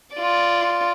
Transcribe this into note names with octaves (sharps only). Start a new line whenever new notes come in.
F4 D5